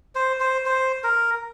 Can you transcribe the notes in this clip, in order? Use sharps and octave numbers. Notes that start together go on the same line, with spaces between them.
C5
C5
C5
A#4